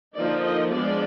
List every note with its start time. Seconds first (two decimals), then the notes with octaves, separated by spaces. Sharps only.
0.15 D3 F3 A#3 D#4 D5
0.44 D#5
0.73 F3 G#3 B3 D4 D5